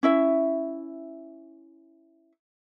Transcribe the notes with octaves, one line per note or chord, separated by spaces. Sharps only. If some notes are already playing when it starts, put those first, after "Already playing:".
C#4 E4 E5